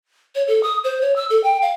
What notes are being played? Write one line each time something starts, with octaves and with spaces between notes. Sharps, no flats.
C#5
A4
D#6
C5
C#5
E6
A4
G5
F5